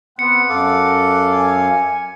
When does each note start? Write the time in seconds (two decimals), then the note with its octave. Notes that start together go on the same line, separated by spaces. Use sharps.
0.19 B3 C4 F#5 C#7
0.49 F#2 A4 F5 D6
1.33 G#5